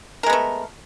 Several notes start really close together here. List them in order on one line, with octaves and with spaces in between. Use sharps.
A#4 G#3 B3 A3